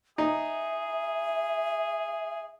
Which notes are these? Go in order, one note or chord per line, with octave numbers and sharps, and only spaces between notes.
D#4 G#4 E5